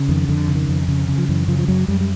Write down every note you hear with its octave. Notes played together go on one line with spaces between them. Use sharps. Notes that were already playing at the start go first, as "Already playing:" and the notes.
Already playing: C#3
F2 D#3
F2 D3
C#3
D#3
F2
C#3
C#3
F3
F#2 E3
C#3 F3
F3
F#2 F#3
F#2 G3
G3